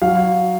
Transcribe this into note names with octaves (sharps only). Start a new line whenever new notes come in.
F#3 F5